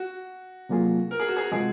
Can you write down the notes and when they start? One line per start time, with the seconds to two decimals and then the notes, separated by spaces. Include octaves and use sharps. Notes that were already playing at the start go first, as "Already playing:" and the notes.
Already playing: F#4
0.69 C3 F#3 A#3 F4 G#4
1.11 A#4
1.19 G#4
1.28 F#4
1.37 G#4
1.52 C3 F3 G#3 G#4